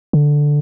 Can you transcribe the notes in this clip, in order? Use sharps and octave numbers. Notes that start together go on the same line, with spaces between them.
D3